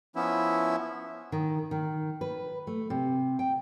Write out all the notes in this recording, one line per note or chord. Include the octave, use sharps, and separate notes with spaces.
F3 B3 C#4 E4 E5
D#3
D#3
B4
A3
C3
G5